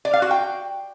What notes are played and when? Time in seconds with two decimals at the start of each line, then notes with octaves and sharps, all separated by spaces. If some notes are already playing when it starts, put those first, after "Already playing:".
0.05 D5
0.13 F5
0.22 F#4
0.31 G5